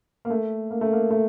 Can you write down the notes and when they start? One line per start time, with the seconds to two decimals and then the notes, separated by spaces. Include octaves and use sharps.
0.25 A#3
0.30 A3
0.71 A#3
0.81 A3
0.93 A#3
1.10 A3